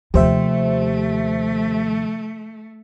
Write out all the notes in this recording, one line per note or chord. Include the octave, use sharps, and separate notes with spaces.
D#2 C3 D#3 F3 A3 G4 C5 E5